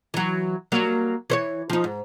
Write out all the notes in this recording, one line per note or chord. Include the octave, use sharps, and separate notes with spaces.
E3 F#3
F#3 G3 A#3
E3 C5 C#5
F3 D#4
G#2